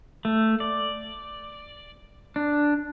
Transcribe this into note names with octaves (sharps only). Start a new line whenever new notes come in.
A3
D5
D4